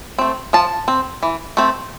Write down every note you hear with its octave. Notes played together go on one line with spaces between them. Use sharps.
A3 C4
F3 A5
C4
E3
A3 C4